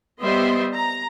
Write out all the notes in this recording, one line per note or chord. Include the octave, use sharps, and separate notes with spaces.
G3 B3 C5 D#5 E5 C6
A#5